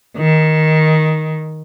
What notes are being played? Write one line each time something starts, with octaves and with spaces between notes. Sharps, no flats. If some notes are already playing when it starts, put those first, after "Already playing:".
D#3